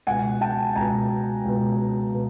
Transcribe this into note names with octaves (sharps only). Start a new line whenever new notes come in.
C#2 B2 F#5 G#5
G5 A5
C#2 B2 G#5 A#5
C#2 B2
B2